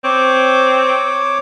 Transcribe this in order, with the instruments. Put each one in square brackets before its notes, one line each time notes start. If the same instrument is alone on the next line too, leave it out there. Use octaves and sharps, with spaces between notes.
[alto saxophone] C4 [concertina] C#5 D6